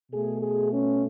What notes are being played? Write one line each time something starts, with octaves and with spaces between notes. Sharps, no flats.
B2 A3 G#4
G#4
C#4